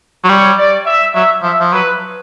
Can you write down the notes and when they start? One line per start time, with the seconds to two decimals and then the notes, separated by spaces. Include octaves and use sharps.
0.24 F#3
0.29 G3 C#5
0.57 D5
0.86 E5
1.14 F#3 E5
1.43 F3 E5
1.60 F3
1.72 F#3 B4